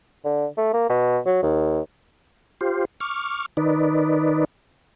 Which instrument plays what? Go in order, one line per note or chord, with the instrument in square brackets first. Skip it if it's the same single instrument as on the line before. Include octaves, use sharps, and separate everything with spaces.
[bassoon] D3
A3
A#3
B2
F#3
D#2
[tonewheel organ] F4 G4 C5
C#6 D6 F6
D#3 D#4 B4 D5